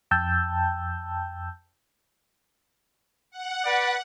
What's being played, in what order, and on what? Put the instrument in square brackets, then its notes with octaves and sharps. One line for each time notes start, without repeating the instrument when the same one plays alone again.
[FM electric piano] F2 G5 A5 E6 G6
[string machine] F#5
[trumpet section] B4 D5